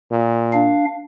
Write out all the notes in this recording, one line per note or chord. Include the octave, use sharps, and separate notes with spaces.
A#2
D4 F5